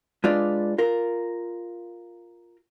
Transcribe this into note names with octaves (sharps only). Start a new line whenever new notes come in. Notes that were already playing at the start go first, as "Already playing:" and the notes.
G#3 D4 F4 B4 D5
F4 A#4